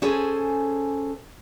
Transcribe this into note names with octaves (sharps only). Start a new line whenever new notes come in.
C#4 G#4 A4 C5 G#5